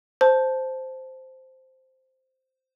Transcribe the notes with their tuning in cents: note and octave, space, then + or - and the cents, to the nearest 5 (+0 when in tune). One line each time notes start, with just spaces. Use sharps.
C5 -5 A5 -5